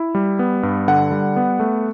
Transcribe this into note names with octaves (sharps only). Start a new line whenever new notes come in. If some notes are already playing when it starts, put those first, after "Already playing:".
Already playing: E4
G3
B3
G2
D3 F#5
G3
B3
A3